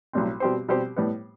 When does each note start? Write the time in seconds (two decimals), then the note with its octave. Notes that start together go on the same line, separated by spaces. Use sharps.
0.13 B1 A2 G3 C4
0.40 B2 G3 C4 G4 C5
0.68 B2 G3 C4 G4 C5
0.97 A2 G3 B3